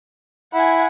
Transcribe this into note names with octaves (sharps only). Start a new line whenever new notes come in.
E4 F#5 G#5